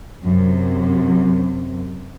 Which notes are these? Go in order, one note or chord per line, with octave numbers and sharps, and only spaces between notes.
F#2 C3